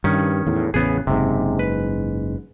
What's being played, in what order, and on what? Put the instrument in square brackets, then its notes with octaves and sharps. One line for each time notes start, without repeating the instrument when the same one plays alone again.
[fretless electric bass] G2 [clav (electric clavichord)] D#3 C#4
[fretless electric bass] E2 A2
[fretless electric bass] A1 E2 C#3 [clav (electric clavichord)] B3 G#4
[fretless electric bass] F#1 G#2 [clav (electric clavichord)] C3
[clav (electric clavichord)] B4